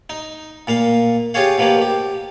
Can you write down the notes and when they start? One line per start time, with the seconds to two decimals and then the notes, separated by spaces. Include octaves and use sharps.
0.10 D#4
0.67 A#2 A#3 F5
1.34 F4 G4 G#4 C#5 F5
1.58 B2 F3 A#3 G4
1.82 G4